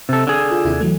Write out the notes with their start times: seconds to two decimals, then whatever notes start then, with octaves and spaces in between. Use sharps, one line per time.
0.09 C3 A4
0.27 D3 G#4
0.51 F4 G#5
0.65 D#2 C3 E4
0.81 E3 F#3 A3